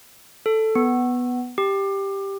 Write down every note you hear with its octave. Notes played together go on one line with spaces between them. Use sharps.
A4
B3
G4